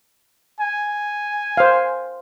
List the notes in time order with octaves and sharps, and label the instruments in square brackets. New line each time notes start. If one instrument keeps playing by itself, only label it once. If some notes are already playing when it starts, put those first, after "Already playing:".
[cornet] G#5
[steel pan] C5 F5